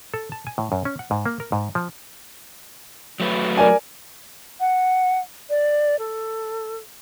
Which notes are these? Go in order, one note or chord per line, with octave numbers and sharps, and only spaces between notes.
A4
A5
G#5
A2
F#2
C#4
F#5
G#2
A#3
A#4
G#2
F3
F#3 A3 B4
A#4 D5 G#5
F#5
D5
A4